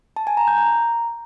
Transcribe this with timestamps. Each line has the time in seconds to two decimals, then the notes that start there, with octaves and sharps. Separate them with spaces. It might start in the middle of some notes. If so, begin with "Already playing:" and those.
0.16 A5
0.27 G#5
0.37 A#5
0.48 G6
0.58 A#5